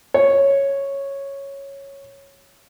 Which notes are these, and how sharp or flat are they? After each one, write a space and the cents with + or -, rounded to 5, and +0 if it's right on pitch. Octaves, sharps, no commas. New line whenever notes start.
C#5 -5